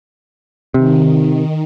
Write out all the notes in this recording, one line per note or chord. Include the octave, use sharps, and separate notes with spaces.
C3 D#3